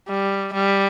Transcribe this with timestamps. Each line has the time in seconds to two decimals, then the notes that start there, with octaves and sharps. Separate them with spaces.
0.09 G3
0.53 G3